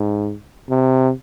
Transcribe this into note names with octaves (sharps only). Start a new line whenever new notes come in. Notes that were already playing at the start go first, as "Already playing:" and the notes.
Already playing: G#2
C3